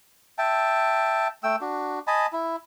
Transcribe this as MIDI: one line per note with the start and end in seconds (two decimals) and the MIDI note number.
0.38 1.28 76
0.38 1.28 79
0.38 1.28 81
1.43 1.56 57
1.43 1.56 79
1.43 1.56 88
1.61 1.99 62
1.61 1.99 66
2.07 2.26 75
2.07 2.26 80
2.07 2.26 81
2.07 2.26 83
2.33 2.56 64